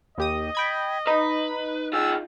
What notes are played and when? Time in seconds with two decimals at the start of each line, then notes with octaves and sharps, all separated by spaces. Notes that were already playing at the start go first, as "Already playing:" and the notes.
0.18 D#2 G4 D#5 D#6
0.55 G5 B5 G#6
1.07 D#4 B4
1.93 F4 G#4 E6